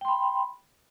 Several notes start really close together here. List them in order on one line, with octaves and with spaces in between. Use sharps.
G5 C6 B5